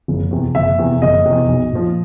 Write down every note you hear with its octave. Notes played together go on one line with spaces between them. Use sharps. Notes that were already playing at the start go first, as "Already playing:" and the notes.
F#1
E2 C3
F#1 E5
E2 C3
F#1 D#5
E2 C3
B1
A#2 F3